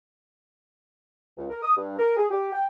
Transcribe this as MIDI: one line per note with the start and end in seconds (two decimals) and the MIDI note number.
1.37 1.45 37
1.50 1.59 70
1.63 1.75 87
1.76 1.95 43
1.99 2.14 70
2.17 2.26 68
2.30 2.49 67
2.53 2.65 79